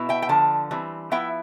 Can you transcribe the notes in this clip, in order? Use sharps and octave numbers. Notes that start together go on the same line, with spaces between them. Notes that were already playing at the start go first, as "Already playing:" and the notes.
Already playing: B2 B3 E4
E5 G5
G5
D3 F3 A5
E3 G3 C4
F3 B3 E4 E5 G5